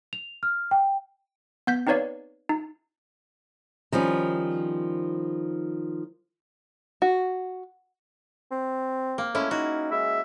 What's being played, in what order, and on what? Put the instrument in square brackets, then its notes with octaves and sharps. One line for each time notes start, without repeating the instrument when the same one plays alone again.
[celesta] F7
F6
G5
[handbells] B3 G6 B6
C4 D#4 B4 C#5 D5 F5
D#4
[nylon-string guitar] D#3 F3 G3 C#4
[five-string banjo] F#4
[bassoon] C4
[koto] A#3
[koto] G#3 C#4 E4 [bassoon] A3
[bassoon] D#4 [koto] F#4
[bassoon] G#3 [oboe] E5